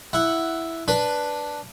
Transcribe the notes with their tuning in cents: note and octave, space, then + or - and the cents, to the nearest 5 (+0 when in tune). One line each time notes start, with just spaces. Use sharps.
E4 +0 F#5 +0
D4 +0 B4 +0